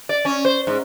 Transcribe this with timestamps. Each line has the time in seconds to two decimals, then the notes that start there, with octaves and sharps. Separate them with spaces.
0.09 D5
0.25 C#4
0.45 C5
0.67 G#2